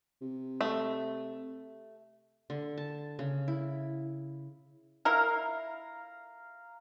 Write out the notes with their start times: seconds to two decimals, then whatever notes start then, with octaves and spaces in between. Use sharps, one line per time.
0.21 C3
0.61 A3
2.50 D3
2.78 A5
3.19 C#3
3.48 E4
5.05 E4 A#4 F5 A#5